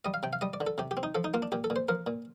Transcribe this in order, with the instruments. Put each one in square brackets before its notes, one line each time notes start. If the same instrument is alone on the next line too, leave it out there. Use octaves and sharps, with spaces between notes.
[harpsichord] G3 D#5
F5
C3 G5
F5
G3 D#5
D5
D3
A4
C3 G4
G4
C4
D#4
F3 A4
D#4
A#3 F4
D4
A#2 G4
A4
A#2
C5
F3 A#4
A#2